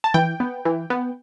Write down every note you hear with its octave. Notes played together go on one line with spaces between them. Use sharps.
A5
E3 G5
B3
E3
B3